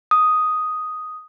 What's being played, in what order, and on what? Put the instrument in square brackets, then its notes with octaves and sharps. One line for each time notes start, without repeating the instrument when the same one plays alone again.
[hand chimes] D#6